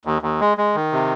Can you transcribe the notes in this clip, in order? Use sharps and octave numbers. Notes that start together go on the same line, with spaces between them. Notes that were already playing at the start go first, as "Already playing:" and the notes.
D#2
D#2
G#3
G#3
D#3
C3